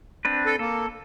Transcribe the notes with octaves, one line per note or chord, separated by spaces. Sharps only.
C4 D4 B4
A4
A#3 A4